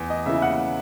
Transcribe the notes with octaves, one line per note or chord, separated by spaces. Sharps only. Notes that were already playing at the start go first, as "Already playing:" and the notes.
Already playing: E2
D#5
C#3 E3 E5
F#5